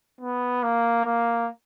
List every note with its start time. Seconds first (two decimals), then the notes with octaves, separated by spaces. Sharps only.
0.21 B3
0.63 A#3
1.05 A#3